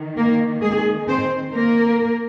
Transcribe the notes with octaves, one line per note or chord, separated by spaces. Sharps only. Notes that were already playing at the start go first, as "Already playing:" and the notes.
Already playing: D#3
A#3 A#4
G#3 G#4
C4 C5
A#3 A#4